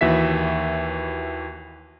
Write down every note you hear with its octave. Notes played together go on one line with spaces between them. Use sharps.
D#2 E3 F#4 E5 B6